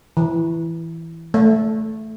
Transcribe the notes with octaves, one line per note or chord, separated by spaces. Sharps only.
E3
A3